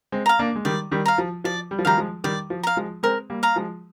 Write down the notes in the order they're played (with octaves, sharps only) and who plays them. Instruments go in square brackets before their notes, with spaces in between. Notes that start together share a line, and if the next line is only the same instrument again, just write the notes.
[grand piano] G#3 C4
[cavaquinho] F5 A#5
[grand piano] A#3 D4
G#3
[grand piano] D#3 G3 [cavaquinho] D5
[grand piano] D#3 G3
[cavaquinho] F5 A#5
[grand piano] F3
[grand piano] F3 [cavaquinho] D5
[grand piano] G3
F3
[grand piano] D#3 G3 [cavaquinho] F5 A#5
[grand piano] F3 G#3
[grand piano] D#3 G3 [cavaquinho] D5
[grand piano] F3
[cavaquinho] F5 A#5
[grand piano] F3 G#3
[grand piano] G#3 C4 [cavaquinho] A#4
[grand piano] G3 A#3
[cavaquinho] F5 A#5
[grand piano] F3 G#3